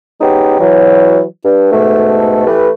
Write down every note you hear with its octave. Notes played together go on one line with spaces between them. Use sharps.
G#3 B3 C#4 D#4 G4
E3 F#3
G2
G#2 B2 A3
E3 A3 G4 B4